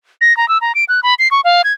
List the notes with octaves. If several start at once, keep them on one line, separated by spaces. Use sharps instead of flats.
A#6
A#5
E6
A#5
D7
F#6
B5
C7
C#6
F5
G#6